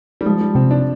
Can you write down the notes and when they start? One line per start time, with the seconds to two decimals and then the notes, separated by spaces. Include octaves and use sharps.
0.21 G3
0.26 F3 G#3
0.41 G3
0.55 C3 C4
0.71 D4